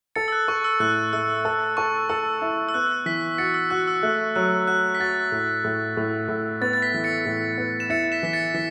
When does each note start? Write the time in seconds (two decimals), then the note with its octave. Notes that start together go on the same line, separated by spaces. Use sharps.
0.15 A4 A6 C#7
0.28 E6
0.32 F#6
0.48 A4 C#6
0.64 E6
0.80 A2 F#6
1.13 A3 E6
1.45 A4 E6
1.77 A4 C#6
2.09 A4 E6
2.42 E4
2.69 E6
2.74 B3 F#6
3.06 E3 B6
3.38 F#4 A6 C#7
3.54 E6
3.70 F#4 F#6
3.87 E6
4.03 A3 F#6
4.36 F#3 F#6
4.68 F#4 F#6
4.95 B6
5.00 F#4 A6
5.32 A2
5.64 A2
5.97 A2
6.28 A2
6.61 B3 A6
6.73 A6
6.82 B6
6.94 E3
7.04 A6 C#7
7.26 A2
7.58 B3
7.80 E7
7.90 E4 A6 C#7
8.12 B6 E7
8.23 E3 B6
8.33 A6 C#7
8.54 E3 B6